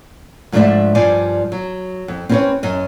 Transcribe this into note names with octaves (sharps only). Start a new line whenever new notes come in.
G#2 F3 A3 D4 D5 E5
G2 F3 D5 G#5
F#3
F2
C4 C#4 E4 G#4 B4 C#5
F#2 D#5